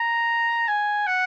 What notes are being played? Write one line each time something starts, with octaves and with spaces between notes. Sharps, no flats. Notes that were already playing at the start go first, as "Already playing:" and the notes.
Already playing: A#5
G#5
F#5